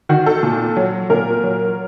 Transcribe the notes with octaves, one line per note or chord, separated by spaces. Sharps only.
D#3 F#4
A4
A#2
F#3
A#2 A#4
F#3